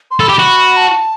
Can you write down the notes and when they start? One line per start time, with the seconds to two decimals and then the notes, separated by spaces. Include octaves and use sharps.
0.11 C6
0.20 A4 B5
0.29 G4
0.39 F#4
0.77 A5